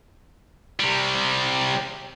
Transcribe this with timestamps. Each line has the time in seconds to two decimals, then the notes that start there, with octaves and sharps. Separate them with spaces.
0.80 C3 G3